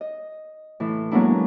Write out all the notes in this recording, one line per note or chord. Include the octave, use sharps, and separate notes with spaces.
D#5
A2 E3
F#3 G#3 A#3 B3 D4 E4